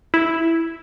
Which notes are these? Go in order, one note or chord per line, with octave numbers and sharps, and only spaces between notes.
E4